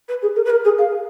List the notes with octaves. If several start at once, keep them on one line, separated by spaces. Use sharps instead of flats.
B4
G#4
A#4
B4
A#4
G#4
F5